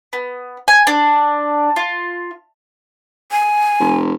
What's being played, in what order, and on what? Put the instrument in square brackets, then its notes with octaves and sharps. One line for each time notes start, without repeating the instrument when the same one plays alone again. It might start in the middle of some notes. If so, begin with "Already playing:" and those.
[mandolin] B3
G#5
D4
F4
[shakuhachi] G#5
[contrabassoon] F1